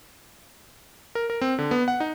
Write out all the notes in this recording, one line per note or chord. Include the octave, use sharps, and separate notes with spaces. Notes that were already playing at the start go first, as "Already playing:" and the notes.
A#4
A#4
C4
D3
B3
F#5
D#4